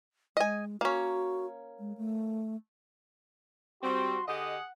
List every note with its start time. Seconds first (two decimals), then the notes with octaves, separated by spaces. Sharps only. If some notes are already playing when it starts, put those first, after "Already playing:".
0.37 G#3 D#5 G#5
0.81 A#3 C#4 F#4
1.79 G#3
1.97 A3
3.83 G3 C4 F#4 C6
4.28 D3 G4 G#4 D#5 F#5